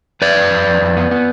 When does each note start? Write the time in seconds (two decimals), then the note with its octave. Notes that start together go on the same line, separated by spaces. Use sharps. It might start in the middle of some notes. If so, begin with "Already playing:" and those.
0.22 F2 B4 D5
0.36 F2
0.51 F2
0.66 F2
0.81 F2
0.97 B3
1.11 B3